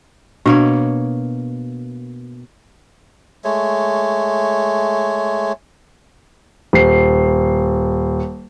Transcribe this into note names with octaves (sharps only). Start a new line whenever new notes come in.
B2 A#3 D4 C#5
G#3 A3 C#5
D#1 C7